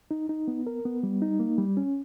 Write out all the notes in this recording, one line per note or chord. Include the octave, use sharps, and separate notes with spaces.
D#4
D#4
B3
A#4
B3
G3
D#4
A#3
G3
C#4